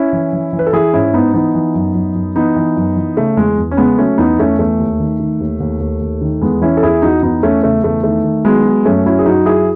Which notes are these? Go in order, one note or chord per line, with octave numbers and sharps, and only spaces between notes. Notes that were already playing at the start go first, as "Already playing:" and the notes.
Already playing: C#4 E4
E3
E3
E3
B4
A4
E3 E4 G#4
G#2 C#4 E4
G#2 B3 D#4
E3 B3 D#4
E3
F#2
F#2
F#2
E3 B3 D#4
E3
F#2
E3
C#3 A3
E2 G#3
E2
C#4
C#3 G#3 B3
F#3 A3 C#4
E2 B3 D#4
E2 A3 C#4
E2 A3
D#2
D#3
D#3
D#2
D#2
D#2
D#2
D#3
E2 G#3 B3
E3 C#4 E4
A4
E2 E4 G#4
E2 D#4 F#4
E2 B3 D#4
E2 A3 C#4
C#3 A3
E2 A3
D#3 A3
D#3
F#3 G#3 B3
F#3
F#2 A3 C#4
F#3 C#4 E4
G#4
F#2 D#4 F#4
F#3 E4 G#4